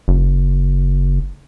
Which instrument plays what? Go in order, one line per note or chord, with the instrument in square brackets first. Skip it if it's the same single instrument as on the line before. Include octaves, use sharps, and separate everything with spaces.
[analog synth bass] F#1